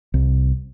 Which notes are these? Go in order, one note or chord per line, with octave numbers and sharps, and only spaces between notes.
C2